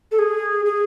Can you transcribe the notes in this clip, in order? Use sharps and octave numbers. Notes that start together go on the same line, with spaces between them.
A4
G#4
G#4